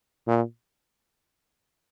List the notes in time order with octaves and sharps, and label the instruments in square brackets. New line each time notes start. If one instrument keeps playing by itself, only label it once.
[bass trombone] A#2